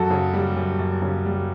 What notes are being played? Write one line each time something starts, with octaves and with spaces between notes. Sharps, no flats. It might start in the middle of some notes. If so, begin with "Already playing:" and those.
Already playing: F#2 F#4 A4
C#3
G3
F#2
F#2
C#3
G3